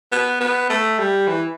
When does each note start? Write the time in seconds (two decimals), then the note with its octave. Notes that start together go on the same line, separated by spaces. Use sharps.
0.12 B3
0.41 B3
0.70 A3
0.99 G3
1.28 E3